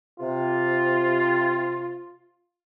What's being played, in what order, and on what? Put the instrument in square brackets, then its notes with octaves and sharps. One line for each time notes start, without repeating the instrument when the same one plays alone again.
[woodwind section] C3 [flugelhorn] F4